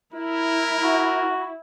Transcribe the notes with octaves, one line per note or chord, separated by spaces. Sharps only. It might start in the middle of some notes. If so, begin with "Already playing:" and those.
E4 A#4
F#4